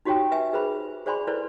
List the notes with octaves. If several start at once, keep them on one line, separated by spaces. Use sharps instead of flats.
D#4 F#4 G4 C#5 G5 A5
B4 E5 G#5
G#4 B4 C5 B5
G#4 C5 D5 G#5 B5 C6
E4 A4 B4 C5 D5